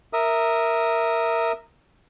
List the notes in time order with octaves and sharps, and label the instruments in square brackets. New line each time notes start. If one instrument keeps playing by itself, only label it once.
[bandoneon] A#4 E5 D#6